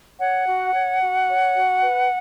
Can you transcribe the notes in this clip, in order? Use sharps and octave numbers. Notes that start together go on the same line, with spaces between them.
C#5 F#5
F#4
C#5
F#4
C#5
F#4
B4